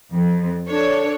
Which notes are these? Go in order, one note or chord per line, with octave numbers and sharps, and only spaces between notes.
F2
D4 A4 C#5